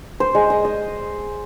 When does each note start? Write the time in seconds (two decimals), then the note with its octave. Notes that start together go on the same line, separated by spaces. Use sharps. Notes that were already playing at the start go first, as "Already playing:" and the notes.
0.20 C5
0.35 G#3
0.50 D#5
0.65 D#5